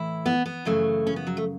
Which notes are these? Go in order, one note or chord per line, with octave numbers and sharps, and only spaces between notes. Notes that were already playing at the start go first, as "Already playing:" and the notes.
Already playing: A2 E3 E4
B3
B3
F#2 C#3 E3 A3
C#4
B3
F#3
A3